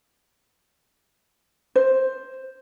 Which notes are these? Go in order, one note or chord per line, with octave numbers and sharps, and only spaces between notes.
C5